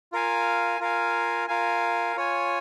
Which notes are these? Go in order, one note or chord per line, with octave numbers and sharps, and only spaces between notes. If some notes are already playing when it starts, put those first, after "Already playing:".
F4 A#4 F5 G#5
F4 A#4 F5 G#5
F4 A#4 F5 G#5
F4 C#5 G#5